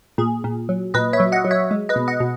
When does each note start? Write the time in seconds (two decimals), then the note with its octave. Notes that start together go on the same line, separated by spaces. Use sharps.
0.18 A#2 G#4
0.44 A#2
0.69 F#3
0.94 A#2 B4 D#5
1.13 C#5 E5
1.20 F#3
1.32 D#5 F#5
1.45 F#3
1.51 C#5 E5
1.71 G#3
1.89 B4 D#5
1.96 B2
2.08 D#5 F#5
2.20 B2